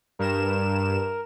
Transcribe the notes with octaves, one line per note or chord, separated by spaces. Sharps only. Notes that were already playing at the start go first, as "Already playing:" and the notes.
G2 A#4 E7